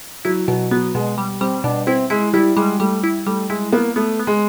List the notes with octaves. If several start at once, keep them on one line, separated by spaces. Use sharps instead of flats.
F#3 E4
B2 F#3
F#3 B3
B2 G#3
G3
G3 C4
B2 D4
C4 E4
G#3 E4
G3 E4
G3 G#3
G3 A3
E4
G3 A3
G#3 E4
A#3 B3
A3 B3
B3
G#3